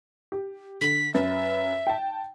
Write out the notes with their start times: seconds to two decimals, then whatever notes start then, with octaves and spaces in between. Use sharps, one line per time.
0.32 G4
0.81 D3 B6
1.14 F#2 B4 E5 A6
1.87 G5 A5